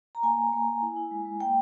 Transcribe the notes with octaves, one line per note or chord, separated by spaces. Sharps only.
A#5
A#3 G#5
A#3
A#3
A#3
E4
E4
G#3
G#3
A#3 G5